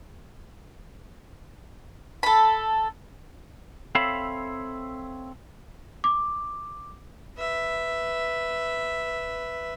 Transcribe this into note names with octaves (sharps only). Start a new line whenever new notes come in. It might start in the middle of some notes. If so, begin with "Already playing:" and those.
A4 B5
C4 A4 C#5 E5 F5 B5
D6
B4 E5